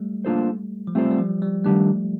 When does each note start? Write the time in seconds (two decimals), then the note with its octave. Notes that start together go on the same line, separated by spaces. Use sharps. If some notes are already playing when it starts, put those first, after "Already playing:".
Already playing: G3 A3
0.25 A#3 D4 F4 A4 C5
0.87 F3
0.95 G3 A3 C4 F4 A4 C5
1.11 G3
1.19 F3
1.42 G3
1.65 D#3 G3 A3 D4 G4